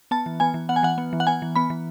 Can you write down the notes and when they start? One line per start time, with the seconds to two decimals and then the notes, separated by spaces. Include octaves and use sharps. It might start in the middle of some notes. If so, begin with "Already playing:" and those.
0.11 B3 A5
0.26 E3
0.40 B3 G#5
0.54 E3
0.69 B3 F#5
0.76 G#5
0.83 E3 F#5
0.98 B3
1.13 E3
1.20 F#5
1.27 B3 G#5
1.42 E3
1.56 B3 B5
1.70 E3